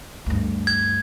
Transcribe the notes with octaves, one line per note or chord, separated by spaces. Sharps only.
D2 G2
G#6